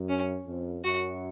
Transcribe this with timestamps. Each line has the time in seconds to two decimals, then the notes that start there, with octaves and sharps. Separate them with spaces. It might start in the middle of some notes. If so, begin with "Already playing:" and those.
Already playing: F#2
0.09 C#4
0.46 F2
0.84 F#2 F#4